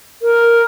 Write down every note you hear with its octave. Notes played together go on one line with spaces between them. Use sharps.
A#4